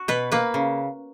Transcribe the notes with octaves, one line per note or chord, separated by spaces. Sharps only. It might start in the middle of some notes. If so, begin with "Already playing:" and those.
Already playing: F#4
B2 B4
A#3 B4
C#3